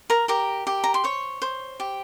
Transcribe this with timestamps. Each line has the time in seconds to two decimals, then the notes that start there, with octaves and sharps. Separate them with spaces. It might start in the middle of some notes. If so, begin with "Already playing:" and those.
0.10 A#4 A#5
0.28 G4 A#4 A#5
0.67 G4
0.84 A#5
0.94 C6
1.04 C5 C#5 C#6
1.42 C5
1.80 G4